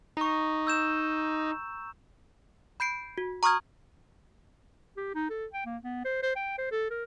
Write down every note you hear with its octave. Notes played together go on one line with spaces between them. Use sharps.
D#4 A#5 C#6
E6 G6 E7
B5 G6 C7 D7
F#4
A#5 C#6 D#6 F6 G#6
G4
D#4
A4
G5
A#3
B3
C5
C5
G5
C5
A4
A#4